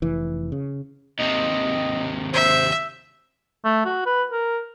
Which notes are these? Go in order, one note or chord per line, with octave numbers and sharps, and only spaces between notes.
F1 E3
C#3
D#2 C3 D#5
C5 E5
A3
F#4
B4
A#4